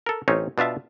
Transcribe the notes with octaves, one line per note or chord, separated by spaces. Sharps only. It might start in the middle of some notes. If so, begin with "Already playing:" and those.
A4 A#4
A1 C4 C#4 D#4 C#5
B2 D4 F4 E5 A5